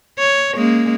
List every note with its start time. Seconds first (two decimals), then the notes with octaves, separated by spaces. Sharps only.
0.18 C#5
0.55 G#3 A#3 C#4